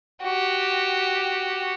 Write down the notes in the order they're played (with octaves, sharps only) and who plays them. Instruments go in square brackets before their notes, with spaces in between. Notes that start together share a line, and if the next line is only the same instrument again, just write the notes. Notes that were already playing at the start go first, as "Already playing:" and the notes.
[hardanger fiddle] F#4 G4